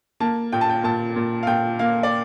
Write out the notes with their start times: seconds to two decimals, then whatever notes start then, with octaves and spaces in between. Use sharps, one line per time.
0.20 A#3 A5
0.52 A#2 G5
0.61 A5
0.69 G5
0.84 A#2 A5
1.16 A#2
1.43 F5
1.47 A#2 G5
1.79 A#3 F5
2.03 D5